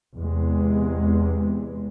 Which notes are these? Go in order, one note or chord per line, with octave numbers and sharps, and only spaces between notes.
E2 C3 G#3